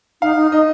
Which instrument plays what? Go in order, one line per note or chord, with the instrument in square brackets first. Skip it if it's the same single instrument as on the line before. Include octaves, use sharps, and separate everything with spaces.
[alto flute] D#4 [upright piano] F5
[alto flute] D#4
[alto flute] D#4 [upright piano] D#5